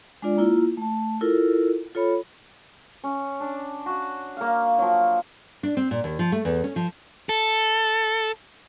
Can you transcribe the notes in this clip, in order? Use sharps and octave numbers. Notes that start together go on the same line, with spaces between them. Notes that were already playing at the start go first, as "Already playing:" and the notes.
G#3 D4 F4 D5
A#3 E4 F4
A3 A5
E4 F4 A4 A#4
F4 A4 C#5 B5
C#4
D4
F#4
A#3 F5
F3 F#3
D4
C4
A#2
D#2
F3
A3
E2
C#4
F3
A4